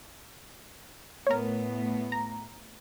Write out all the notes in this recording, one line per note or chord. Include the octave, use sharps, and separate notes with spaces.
A2 B3 A#4 C#5
A#5